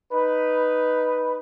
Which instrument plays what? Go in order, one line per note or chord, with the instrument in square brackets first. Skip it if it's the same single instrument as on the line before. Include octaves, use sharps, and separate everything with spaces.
[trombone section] D#4 B4